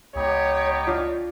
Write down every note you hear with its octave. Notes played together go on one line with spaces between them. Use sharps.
C#2 B3 D#4 G4 C#5
D4 F4